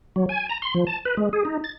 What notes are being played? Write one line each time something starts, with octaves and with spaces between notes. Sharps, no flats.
F#3
G#5
A#5
C6
F3
A5
B4
G#3
G#4
D#4
A6